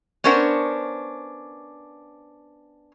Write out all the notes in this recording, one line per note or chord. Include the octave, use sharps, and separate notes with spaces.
B3 C#4 D4 A#4 C5 F#5